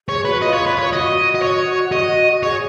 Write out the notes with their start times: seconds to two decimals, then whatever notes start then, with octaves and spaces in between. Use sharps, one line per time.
0.08 G#4 C#5
0.25 F#4 B4
0.42 F4 D#5
0.54 C#5
0.67 B4
0.79 C#5
0.91 F#4 D#5
1.35 D#5
1.43 C#5
1.92 D#5
2.43 G#4 C#5